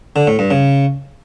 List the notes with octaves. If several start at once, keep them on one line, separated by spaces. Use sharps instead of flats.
D3
A2
G2
C#3